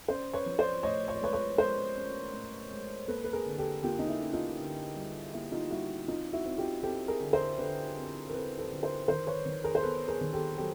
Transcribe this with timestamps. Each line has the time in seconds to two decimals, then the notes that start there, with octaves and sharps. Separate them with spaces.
0.08 C#4 C5 D5
0.33 B4 C#5
0.46 F3
0.58 C5 D5
0.83 A2 C#5 D#5
1.08 C#5
1.16 D5
1.21 G#3 B4 C#5
1.33 B4 C#5
1.58 G#3 A#4 C5
1.96 C#4
2.33 A2
2.71 G#3
3.08 A#3 A4 B4
3.24 B4
3.33 G#4 A#4
3.46 D3
3.58 G4 A4
3.83 A#3 F4 G4
3.99 D#4
4.08 E4
4.21 C#4
4.33 D#4 F4
4.58 D3
4.96 G3
5.33 A#3 E4
5.52 D#4 F4
5.70 G3 E4 F#4
6.08 C4 D#4 F4
6.33 E4 F#4
6.46 C4
6.58 F4 G4
6.83 C4 G4 A4
7.08 G#4 A#4
7.20 D3
7.33 A#4 C5
7.58 D3 A4 B4
7.96 C4
8.29 A#4
8.33 C4 A4 B4
8.58 A4 B4
8.71 D3
8.83 A#4 C5
9.08 D#3 A#4 C5
9.27 B4 C#5
9.46 D#3
9.64 G#4 A#4
9.75 C5
9.83 B3 A4 B4
10.08 G#4 A#4
10.21 D#3
10.33 G4 A4
10.58 F#3 G4 A4